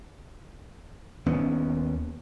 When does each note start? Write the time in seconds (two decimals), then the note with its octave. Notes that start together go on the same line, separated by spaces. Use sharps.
1.26 D#2 B3 C#4